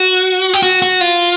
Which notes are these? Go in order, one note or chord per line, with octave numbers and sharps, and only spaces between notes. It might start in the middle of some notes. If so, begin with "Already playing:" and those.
Already playing: F#4
G4
F#4
F#4
F4